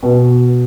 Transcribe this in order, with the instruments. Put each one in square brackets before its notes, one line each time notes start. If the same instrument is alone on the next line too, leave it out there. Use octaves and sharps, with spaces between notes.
[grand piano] B2